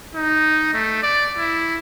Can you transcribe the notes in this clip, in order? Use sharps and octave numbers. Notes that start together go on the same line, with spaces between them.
D#4
A3
D5
E4